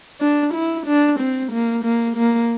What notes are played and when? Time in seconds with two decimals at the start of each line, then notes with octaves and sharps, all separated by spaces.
0.20 D4
0.54 E4
0.86 D4
1.19 C4
1.52 A#3
1.84 A#3
2.16 A#3